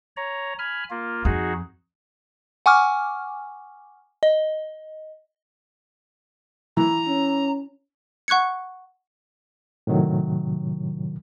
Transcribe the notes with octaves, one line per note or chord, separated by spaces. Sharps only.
C#5 A#5
G#5 B5 F6
A#3 F4
F2 D#4 F#4 G#4
F#5 G#5 C#6 D6 F6
D#5
E3 A#5
C#4
F#5 C#6 F#6 G#6 C#7
A2 C3 D#3 F#3